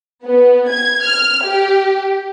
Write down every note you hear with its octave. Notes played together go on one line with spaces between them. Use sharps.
B3
G#6
F6
G4